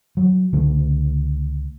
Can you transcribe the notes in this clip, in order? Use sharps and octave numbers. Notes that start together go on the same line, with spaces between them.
F#3
C#2 D3 A3